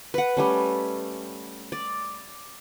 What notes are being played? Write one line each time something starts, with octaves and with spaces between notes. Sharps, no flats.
B4 F#5
G3 A3 C#4
D5